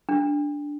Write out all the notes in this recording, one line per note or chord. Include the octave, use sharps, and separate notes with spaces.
D4